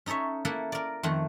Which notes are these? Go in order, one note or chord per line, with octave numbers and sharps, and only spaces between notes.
C#4 D#4 A4 C#5 E5
A#3 E4 A4 F#5
A#4 D5
F2 D#3 A3 F#5